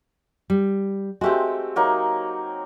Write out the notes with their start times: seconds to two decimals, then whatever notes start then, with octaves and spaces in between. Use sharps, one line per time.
0.50 G3
1.21 G#3 A3 C4 F#4 G4
1.76 F#3 A#3 D#4